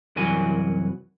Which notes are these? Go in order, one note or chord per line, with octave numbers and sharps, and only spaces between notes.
C2 F#2 E3 F#4 G#5